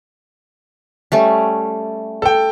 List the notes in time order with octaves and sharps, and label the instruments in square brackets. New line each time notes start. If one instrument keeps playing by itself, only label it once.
[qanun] G3 A3 C#4
[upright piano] A4 G5